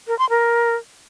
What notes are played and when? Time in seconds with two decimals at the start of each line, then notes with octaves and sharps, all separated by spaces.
0.08 A#4
0.19 C6
0.30 A#4